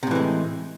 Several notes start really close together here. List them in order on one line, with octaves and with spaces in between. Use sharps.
C3 A2 E3 G#3